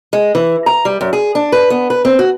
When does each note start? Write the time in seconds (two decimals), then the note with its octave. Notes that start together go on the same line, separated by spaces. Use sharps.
0.13 G#3
0.35 E3
0.66 A#5
0.85 G3
1.01 F#2
1.13 G#4
1.35 D4
1.52 B4
1.70 B3
1.90 B4
2.05 C4
2.19 F#4